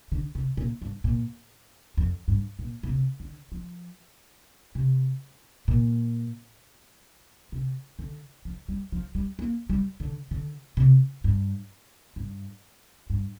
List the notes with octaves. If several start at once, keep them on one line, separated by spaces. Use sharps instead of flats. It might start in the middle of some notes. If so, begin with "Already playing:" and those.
D3
C3
A#2
G2
A#2
F2
G2
A#2
A#2
C3
D3
F3
C3
A#2
C3
D3
F3
G3
F3
G3
A#3
G3
D3
D3
C3
G2
G2
G2